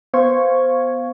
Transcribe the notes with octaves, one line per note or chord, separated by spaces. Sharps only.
B3 C5 F5 C#6 G#6